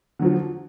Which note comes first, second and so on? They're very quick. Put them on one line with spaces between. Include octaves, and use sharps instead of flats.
D3 F#3 F3